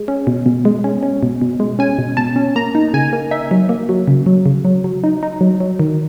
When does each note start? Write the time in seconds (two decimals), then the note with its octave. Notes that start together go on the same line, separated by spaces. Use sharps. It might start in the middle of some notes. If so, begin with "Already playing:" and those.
Already playing: G#3
0.08 C#4
0.27 B2
0.46 B2
0.65 G#3
0.84 C#4
1.03 C#4
1.23 B2
1.41 B2
1.60 G#3
1.79 C#4 G#5
1.98 B2
2.17 B2 A5
2.36 C#4
2.56 A#3 A#5
2.75 D#4
2.94 C#3 G#5
3.13 A#3
3.31 D#4 E5
3.51 F#3
3.69 A#3
3.89 F#3
4.08 C#3
4.26 F#3
4.46 C#3
4.65 F#3
4.84 F#3
5.04 D#4
5.23 D#4
5.41 F#3
5.60 F#3
5.80 D#3